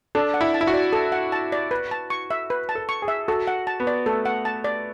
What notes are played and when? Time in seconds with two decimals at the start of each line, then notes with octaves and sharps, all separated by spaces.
0.15 D4 A4
0.34 F#5
0.41 E4
0.54 A5
0.61 E4
0.67 F#4
0.74 D5
0.93 A4
1.12 F#5
1.32 A5
1.52 D5
1.71 B4
1.91 A5
2.10 C#6
2.31 E5
2.50 B4
2.69 A5
2.75 A4
2.89 C#6
3.02 G#4
3.08 E5
3.28 F#4 A4
3.47 F#5
3.67 A5
3.80 B3
3.87 D5
4.06 A3 A4
4.25 F#5
4.45 A5
4.64 D5